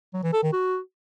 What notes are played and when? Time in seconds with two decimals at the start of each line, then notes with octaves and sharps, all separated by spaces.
0.14 F#3
0.23 E3
0.33 A4
0.43 D#3
0.52 F#4